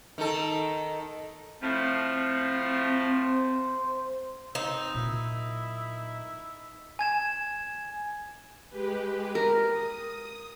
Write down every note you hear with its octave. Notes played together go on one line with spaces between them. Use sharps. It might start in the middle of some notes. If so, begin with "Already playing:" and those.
D#3 A4
A2 F3 C4
C5
C4 D#4
A#2 F#3 E4
G#5 G#6 E7
G#3 G4 B4
A#4
D#6